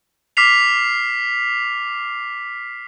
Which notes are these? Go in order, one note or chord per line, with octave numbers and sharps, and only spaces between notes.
D6 F6 B6 C7 F7